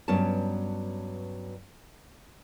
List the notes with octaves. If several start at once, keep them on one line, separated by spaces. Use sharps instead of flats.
G2 F#3 B3 C#4 C#5 A5